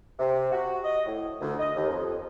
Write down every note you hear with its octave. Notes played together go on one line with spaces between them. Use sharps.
C3
F#4
D#5
A2
D2
D#5
D#2
F2